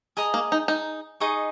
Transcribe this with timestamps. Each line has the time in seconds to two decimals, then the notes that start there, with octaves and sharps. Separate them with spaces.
0.17 G#4 D#5 A#5 D#6
0.34 A#3
0.52 D#4
0.68 D#4
1.20 D#4 G#4 D#5 C#6